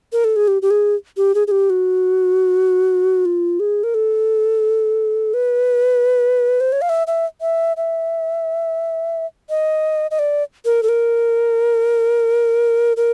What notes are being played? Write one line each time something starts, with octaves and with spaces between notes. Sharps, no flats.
A#4
A4
G#4
G4
G4
G#4
G4
G#4
G#4
G4
F#4
F4
G#4
A#4
A4
B4
C5
C#5
F5
E5
E5
E5
E5
D#5
D#5
D5
A#4
A4
A#4
A#4